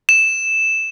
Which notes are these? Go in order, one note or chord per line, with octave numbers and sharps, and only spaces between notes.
E7